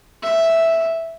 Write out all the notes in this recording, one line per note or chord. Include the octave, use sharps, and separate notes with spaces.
E5